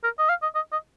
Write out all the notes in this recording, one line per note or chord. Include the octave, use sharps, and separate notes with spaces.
A#4
D#5
F5
D#5
D#5
D#5